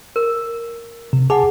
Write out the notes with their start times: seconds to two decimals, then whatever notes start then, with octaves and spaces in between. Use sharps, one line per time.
0.16 A#4
1.13 C3
1.30 G#4 F#5 G#5 A5 D6